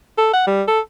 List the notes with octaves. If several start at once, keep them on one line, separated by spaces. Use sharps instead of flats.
A4
F#5
G3
A4